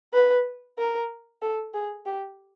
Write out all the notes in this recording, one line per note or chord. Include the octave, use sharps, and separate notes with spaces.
B4
A#4
A4
G#4
G4